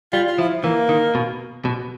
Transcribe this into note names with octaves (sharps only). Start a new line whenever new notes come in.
G3 F4
F4
F3 E4
E3 A#3
D#3
B2
B2